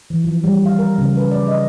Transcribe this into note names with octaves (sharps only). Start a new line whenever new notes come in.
E3
F3
G3
F5
A#4
C#3
B4
D5
D#5